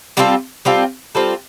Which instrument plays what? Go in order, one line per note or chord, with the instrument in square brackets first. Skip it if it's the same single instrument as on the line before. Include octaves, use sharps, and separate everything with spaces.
[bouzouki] G3 C4 F4 A4
G3 C4 F4 A4
G3 C4 F4 A4